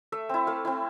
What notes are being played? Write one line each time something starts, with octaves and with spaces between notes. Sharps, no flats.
A3 E5
C4 E4
A3 F5
C4 E4